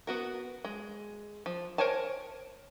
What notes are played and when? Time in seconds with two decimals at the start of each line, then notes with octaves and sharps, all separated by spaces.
0.07 B3 F#4 A#4
0.64 G#3
1.46 F3
1.78 A#4 C5 C#5 G#5 A5